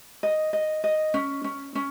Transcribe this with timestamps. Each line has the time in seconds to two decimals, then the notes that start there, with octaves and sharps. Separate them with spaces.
0.23 D#5
0.53 D#5
0.84 D#5
1.14 C#4
1.44 C#4
1.75 C#4